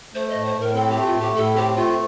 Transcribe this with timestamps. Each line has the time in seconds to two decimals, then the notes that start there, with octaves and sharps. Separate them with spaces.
0.14 A3 C5
0.30 A2 D#5
0.45 C5
0.55 A2
0.60 A#4
0.75 C4 A4
0.90 G4
0.95 A3
1.06 F4
1.15 A2
1.20 G4
1.35 A2 A4
1.56 C4 G4
1.76 A3 F4